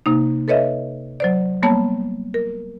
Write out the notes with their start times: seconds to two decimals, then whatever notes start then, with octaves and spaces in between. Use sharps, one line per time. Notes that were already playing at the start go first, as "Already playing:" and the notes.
0.06 C3 A#3 D#4
0.48 A4 B4 C#5 D#5 E5
1.20 F#3 C5 D5
1.63 G3 A#3 B3 C#5 A5
2.34 A#4